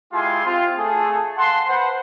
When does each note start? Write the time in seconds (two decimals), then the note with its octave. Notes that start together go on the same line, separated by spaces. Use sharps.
0.13 G#3 E4 F4 G4 G#5 C6
0.45 C4 F4
0.77 A3 G#4 A4
1.38 F5 F#5 A5 C6
1.68 B4 C5 F#5